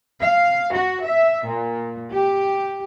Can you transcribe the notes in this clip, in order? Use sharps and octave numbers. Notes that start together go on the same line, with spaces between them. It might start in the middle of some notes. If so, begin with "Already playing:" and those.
F5
F#4
E5
A#2
G4